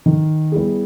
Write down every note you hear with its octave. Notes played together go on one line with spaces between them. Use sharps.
D#3
G3 B3 E4 G#4